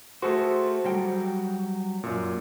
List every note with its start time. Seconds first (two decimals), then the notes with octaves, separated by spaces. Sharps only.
0.22 A3 F#4 G#4 A4 C5
0.85 F#3 G3 G5
2.03 F#2 A#2